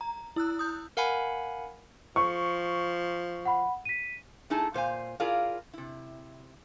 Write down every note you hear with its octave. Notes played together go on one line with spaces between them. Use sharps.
A#5
E4 E6 F#6
D#6 G6
A#4 F5 F#5 G#5 B5
F3 C#6
F#5 B5
B6 D#7
A3 D#4 E4 G#4 A4 A5
A#2 C5 F5 G#5
E4 F4 G#4 A#4 D5 F5
C3 E4